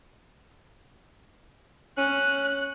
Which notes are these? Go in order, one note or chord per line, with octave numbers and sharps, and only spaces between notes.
C#4 F#6